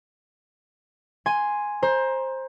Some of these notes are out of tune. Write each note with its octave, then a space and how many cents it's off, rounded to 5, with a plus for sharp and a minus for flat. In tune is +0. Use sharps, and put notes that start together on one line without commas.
G#5 +0 C6 +0
C5 +15 A#5 +25